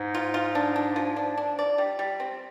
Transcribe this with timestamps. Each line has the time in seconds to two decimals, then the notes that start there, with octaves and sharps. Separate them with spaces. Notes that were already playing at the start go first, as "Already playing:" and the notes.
Already playing: G#2
0.14 F4
0.34 F4
0.55 D4
0.76 D4
0.96 F3
1.16 D4
1.38 D4
1.59 D5
1.78 G3
1.99 G3
2.20 C4